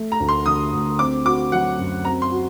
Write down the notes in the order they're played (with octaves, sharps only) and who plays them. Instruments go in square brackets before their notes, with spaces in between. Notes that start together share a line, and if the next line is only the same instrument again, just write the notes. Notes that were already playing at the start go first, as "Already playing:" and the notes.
Already playing: [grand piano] A3
[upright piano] A#5
[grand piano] D2
[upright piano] C6
[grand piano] D3 [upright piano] D#6
[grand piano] D2
[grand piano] C4 [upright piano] D6
[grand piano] F#4 [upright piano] D6
[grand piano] F#3 [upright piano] F#5
[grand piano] F#2
[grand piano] C4 [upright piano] A#5
[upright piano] C6
[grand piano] F#4